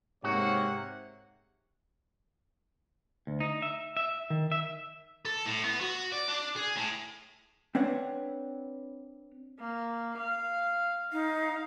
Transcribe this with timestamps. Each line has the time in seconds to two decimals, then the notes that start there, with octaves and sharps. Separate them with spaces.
0.24 G#2 C3 A#3 F#4 C#5 F#5
3.27 D2
3.40 D#4
3.62 E5
3.97 E5
4.30 D#3
4.52 E5
5.25 A4
5.46 A2
5.63 B3
5.81 F#4
6.12 D5
6.28 D4
6.56 G#4
6.76 A2
7.75 C4 D4 B4 C#5 F#5
9.59 A#3
10.17 F5
11.13 D#4 F5